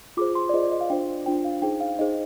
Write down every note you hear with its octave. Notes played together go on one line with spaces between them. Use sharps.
F4 G#4 C5 D6
C6
D5
F4 G#4 C5 D#5
D5
D#5
F5
D4 F4 C5 G5
D4 F4 C5 G5
F5
D#4 G#4 C5 G5
F5
D#4 G#4 C5 D#5